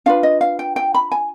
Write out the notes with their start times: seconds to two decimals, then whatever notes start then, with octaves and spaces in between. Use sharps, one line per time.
0.06 D4 F4 B4 F5
0.23 D#5
0.41 F5
0.59 G5
0.76 G5
0.94 B5
1.12 G#5